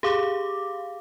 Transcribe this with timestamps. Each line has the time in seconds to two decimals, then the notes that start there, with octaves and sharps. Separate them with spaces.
0.03 G4 G#4 F5 D6